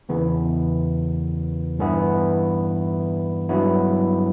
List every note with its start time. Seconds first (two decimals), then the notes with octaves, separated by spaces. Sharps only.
0.09 E2 C#3 E3 B3
1.79 G2 E3 B3 E4
3.49 G2 F#3 B3 E4